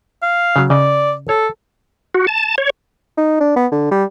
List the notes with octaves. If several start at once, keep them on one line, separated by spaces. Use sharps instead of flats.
F5
C#3 F#3
C#3 D5 D#5
A4 C#5
F#4
A5
C#5
D#4
D4
B3
D3
G3